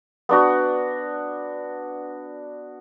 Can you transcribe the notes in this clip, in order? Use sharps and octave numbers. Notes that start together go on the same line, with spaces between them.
B3 D4 F#4